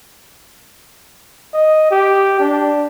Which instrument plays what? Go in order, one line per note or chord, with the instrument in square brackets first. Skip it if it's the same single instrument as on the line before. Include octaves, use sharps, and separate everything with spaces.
[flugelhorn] D#5
G4
D4